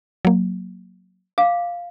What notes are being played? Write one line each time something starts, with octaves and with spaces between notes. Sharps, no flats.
F#3 A#3
F5 D6